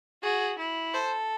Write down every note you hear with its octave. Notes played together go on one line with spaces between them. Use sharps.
F#4 G#4
E4
A4 C5